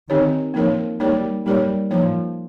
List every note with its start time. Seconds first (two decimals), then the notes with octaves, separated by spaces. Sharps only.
0.09 D#3 C4 D#4 G4 C#5
0.54 F3 A#3 D#4 A#4 C#5
1.00 G3 A#3 D#4 A#4 C#5
1.46 G3 A#3 D#4 A#4 C#5
1.91 F3 A#3 D#4 A#4 C#5